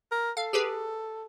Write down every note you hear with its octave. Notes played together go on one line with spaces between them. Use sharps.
A#4
A4 F5
G4 G#4 B4